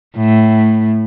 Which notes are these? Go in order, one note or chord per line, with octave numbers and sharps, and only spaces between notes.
A2